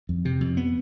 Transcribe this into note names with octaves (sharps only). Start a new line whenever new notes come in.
F2
C3
F2
B3